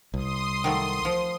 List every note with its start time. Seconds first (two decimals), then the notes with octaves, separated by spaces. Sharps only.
0.14 C2 C6 D#6
0.64 D#3 F#3 A3
1.05 F3